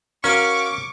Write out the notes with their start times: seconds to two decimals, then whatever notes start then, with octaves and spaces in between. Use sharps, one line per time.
0.24 C#4 F#4 A#4 F5 C#6 D6